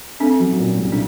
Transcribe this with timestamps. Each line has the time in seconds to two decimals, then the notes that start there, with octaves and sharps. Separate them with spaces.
0.20 A3 C4 D4
0.40 F#3
0.59 A#2
0.79 C2
0.92 D4